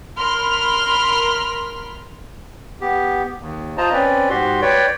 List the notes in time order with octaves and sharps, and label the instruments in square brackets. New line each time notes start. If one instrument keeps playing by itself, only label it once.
[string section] A#4 B5 C6 F6
[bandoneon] B3 G4
D#2
F4 C5 D#5 A5 A#5
C4 C#4 B4 D5
G#2 F#4 G4 C6
B4 C#5 D5 G5